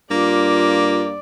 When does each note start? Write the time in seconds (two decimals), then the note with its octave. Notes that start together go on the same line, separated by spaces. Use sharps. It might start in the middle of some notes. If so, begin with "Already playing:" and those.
0.11 G2 A#3 F4 D5